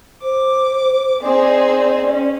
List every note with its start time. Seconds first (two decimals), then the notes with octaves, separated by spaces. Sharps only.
0.22 C5 D6
1.21 C4 D#4 G#4 D5
2.06 C#4